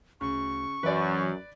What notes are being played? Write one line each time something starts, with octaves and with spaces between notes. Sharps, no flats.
D2 C#3 C#6
F#2 E3 B4 D5